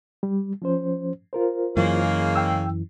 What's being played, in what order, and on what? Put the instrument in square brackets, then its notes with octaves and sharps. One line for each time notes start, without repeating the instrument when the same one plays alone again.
[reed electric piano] G3
F3 C#4 C5
F4 A#4 C5
[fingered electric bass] F#2 E3 [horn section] C#3 G#3 A#3
[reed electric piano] G5 E6